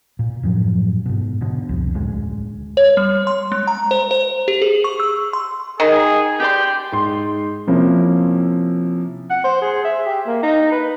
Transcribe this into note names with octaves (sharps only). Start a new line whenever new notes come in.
A#2
F#2 A2 F3 F#3
G#2 B2
B2 D3
C2 F2
D1 D2 G#3
C#5
G3
C6
G#3
A#5
C5
C5
G4
G#4
C#6
E6
C6
D#3 G#4
G4 D5 C6 G6
G#2 C6
C3 F3 A#3 C#4 E4
F#5
C5
G#4
E5
G4
A#3
D#4
B4